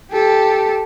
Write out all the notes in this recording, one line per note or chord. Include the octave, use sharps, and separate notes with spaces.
G4 A4